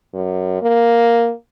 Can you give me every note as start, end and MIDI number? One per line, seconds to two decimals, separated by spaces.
0.14 0.58 42
0.62 1.31 58